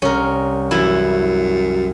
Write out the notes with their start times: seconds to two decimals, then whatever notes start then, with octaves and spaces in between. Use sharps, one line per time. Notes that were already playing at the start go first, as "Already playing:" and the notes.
0.02 C2 C#4 A#4
0.71 F#2 E3 E4